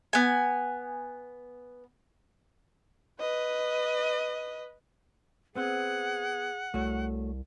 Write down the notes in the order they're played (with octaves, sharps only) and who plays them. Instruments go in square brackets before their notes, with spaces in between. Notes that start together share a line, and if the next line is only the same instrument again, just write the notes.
[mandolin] B3 G#5
[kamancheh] B4 D#5
[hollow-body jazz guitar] B3 C4 C5 [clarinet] G#4 [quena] F#5
[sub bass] C2 [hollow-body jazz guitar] A3 F#4 C#5